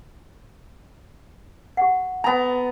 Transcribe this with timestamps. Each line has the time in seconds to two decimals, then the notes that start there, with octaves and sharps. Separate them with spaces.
1.77 G4 F#5
2.24 B3 G#5 A#5